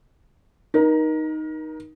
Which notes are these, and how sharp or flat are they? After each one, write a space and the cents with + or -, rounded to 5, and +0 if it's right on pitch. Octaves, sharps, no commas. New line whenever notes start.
D#4 +0 A#4 +30